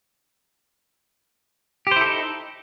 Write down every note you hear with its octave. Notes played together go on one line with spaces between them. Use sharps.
D#4 E4 G4 A4 C5